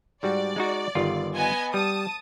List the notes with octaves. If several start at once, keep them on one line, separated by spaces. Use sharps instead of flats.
G#2 G3 F#4 D5
G#3 D#4 F#4
G1 D#3 F4
B3 D#5 G#5
G3 A5 D#6